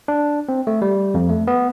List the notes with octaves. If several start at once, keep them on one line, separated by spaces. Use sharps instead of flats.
D4
C4
A3
G3
F2
A3
B3